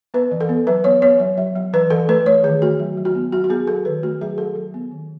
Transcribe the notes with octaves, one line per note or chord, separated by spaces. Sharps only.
B3 B4
E3
A4
B3
F#3 B4
B3 C#5
B3 C#5
F#3
F#3
F#3
E3 B4
E3 A4
A3 B4
A3 C#5
D#3 G#4
A3 F#4
F#3
F#3
F#4
B3
F#3 F#4
F#4
B3 G#4
F#3 A4
D#3 B4
A3 F#4
F#3 G#4
F#3 A4
F#3
B3
D#3